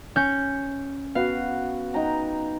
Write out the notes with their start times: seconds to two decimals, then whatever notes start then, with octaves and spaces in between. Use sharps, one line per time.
0.16 C#4 G6
1.15 B3 F#4 F5
1.94 D#4 G5 A#5